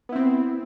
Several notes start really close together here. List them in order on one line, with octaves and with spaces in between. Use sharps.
B3 E4 C4